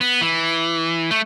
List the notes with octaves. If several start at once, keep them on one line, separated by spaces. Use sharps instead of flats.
B3
E3
A3